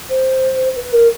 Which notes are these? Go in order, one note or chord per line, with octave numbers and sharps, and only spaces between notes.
C5
B4
A#4